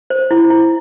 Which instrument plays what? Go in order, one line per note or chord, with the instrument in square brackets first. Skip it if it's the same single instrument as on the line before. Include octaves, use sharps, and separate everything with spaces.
[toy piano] C5
E4
E4